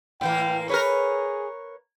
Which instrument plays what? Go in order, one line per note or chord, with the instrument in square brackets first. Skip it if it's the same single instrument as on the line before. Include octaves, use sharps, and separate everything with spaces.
[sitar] A2 E3 A#3 [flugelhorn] G5
[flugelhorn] G#4 [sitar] A#4 B4 C#5